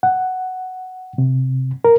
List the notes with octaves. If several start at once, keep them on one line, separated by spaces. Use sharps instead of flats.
F#5
C3
A#4